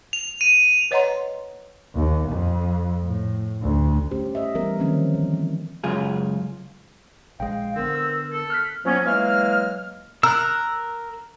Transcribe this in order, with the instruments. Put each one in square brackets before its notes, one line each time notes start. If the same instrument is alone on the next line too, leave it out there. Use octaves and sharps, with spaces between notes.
[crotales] F7
D#7
[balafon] B4 C#5 D#5 F#5 A#5 C6
[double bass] D#2
F2
A2
D2
[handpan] A3 C#4 G4 C5
D#5 E5
E3 G3 B3 A#4
D3 D#3 F3 A#3 C4 C#4
E3
C4
[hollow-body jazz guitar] C#2 F#2 F4 G#4
[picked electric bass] A#1 G#3 [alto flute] F5 [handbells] G5
[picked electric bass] D3 B3 [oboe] C4 [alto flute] A#4
[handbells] E6
[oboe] A4
[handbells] F6 F#6 B6
[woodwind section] F3 F#3 A#3 B3 C#4
E3 F#3 G#3 A#3 F5 F6
[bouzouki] A#4 [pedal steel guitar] E6 F#6